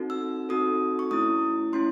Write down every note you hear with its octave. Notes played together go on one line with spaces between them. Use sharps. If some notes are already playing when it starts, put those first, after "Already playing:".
Already playing: C4 D#4 F#4 A4
E6
C4 D#4 F#4 A4 D#6
C#6
A3 C#4 E4 D#6
A3 C#4 E4 C6